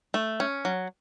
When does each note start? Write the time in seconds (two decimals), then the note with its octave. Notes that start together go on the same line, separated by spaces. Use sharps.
0.14 A3
0.40 C#4
0.65 F#3